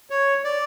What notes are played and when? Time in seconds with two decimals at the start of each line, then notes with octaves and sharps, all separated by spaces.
0.10 C#5
0.44 D5